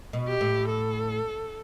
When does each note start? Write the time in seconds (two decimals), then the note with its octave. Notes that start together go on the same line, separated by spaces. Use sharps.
0.13 B2
0.27 G4
0.41 A2
0.68 A4